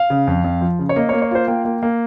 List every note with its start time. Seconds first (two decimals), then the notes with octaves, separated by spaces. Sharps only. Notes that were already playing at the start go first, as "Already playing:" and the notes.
Already playing: F5
0.10 C#3
0.27 F2
0.44 F2
0.61 F3
0.79 C#3
0.89 C#5
0.96 A#3 D#5
1.09 C#5
1.13 A#3
1.22 C#5
1.31 F4 C5
1.47 A#3 G5
1.65 A#3
1.83 A#3